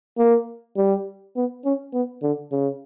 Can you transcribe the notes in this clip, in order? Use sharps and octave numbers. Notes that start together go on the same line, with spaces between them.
A#3
G3
B3
C#4
B3
D3
C#3